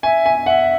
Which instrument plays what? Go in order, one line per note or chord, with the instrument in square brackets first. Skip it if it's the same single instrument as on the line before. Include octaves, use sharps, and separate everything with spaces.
[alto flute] E5 [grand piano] G#5
[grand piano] G#5
[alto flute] E5 [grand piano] F#5